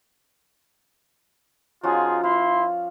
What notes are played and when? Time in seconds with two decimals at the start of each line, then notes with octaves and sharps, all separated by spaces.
1.83 F3 C#4 D#4 F4 F#4 G#4
2.24 E4 F5 C6